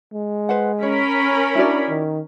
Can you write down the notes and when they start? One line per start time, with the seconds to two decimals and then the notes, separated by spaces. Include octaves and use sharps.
0.13 G#3
0.49 B4 C5 F#5
0.83 C#4 A#4 C#5 B5
1.55 D4 E4 F#4 D5
1.89 D#3